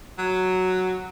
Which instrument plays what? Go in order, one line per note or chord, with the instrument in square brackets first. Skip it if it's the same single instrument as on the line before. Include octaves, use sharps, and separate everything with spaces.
[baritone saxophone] F#3